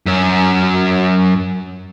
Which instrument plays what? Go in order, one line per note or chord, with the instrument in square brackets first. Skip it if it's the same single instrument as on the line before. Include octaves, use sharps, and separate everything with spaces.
[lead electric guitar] F#2 C#4